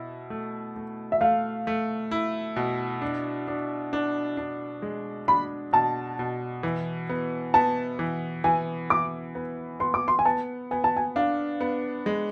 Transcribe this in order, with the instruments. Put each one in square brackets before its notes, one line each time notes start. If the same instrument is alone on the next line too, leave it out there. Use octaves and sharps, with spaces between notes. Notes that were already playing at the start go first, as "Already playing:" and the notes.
Already playing: [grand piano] B2 E4
A3
A3
[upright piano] E5
[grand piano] A3 [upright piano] F5
[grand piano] A3
E4
B2
D4
D4
D4
D4
G#3
[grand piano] D4 [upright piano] B5
[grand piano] B2 [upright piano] A5
[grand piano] B2
E3
B3
[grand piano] B3 [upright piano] A5
[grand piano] E3
[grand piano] E3 [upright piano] G#5
[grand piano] E3 [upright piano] D6
[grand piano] B3
[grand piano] B3 [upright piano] C6
[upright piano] D6
C6
G#5
[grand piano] B3 [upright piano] A5
[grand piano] B3 [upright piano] G#5
[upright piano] A5
G#5
[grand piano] D4 [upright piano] F5
[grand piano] B3
G#3